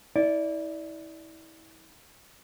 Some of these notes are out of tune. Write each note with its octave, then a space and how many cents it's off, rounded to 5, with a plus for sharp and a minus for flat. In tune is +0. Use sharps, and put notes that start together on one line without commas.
E4 -35 D5 -10